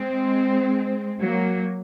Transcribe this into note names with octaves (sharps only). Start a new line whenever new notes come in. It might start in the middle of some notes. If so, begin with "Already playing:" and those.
Already playing: G#3 C4
F#3 A#3